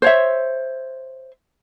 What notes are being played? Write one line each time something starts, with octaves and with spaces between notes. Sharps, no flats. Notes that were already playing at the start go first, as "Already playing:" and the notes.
C5 C#5 E5